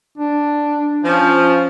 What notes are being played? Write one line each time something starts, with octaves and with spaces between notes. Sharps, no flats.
D4
F3 C#4